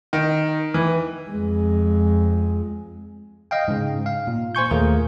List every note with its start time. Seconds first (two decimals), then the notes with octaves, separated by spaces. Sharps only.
0.13 D#3
0.74 E3
1.30 F2 G#3
3.51 D#5 F5 G5
3.68 G#2 C#3
4.06 F5
4.27 A#2
4.55 C5 G#5 C#6 G6
4.71 D#2 A#2 A3 A#3 G#4 A#4